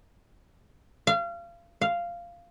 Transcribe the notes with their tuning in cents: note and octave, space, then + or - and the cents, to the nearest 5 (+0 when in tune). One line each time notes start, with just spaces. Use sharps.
F5 -30
F5 -10